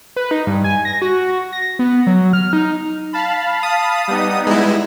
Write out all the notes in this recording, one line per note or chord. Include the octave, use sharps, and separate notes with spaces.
B4
D#4
G2
G#5
A#6
F#4
A#6
B3
F#3
F6
D#4
F5 A5 B5
D#6
G3 B3 D#4
G#3 E4